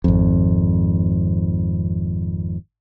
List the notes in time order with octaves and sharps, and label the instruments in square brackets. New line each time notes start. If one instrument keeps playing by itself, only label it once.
[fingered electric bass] G#1 F2